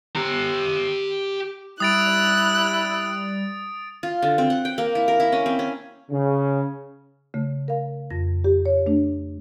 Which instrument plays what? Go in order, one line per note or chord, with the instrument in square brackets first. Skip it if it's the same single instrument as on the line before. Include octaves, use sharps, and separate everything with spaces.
[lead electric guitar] G4 A#5
[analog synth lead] G3 [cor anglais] E4 [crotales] D#6 A6 D7 [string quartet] F#6
[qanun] F4
D3
C4
F#5
G5
A#3
E4
A#4
E4
C#4
C4
C#4
[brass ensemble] C#3
[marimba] C#3 A3
A#4 F5
F2 A#6
G4
C#5
A3 D4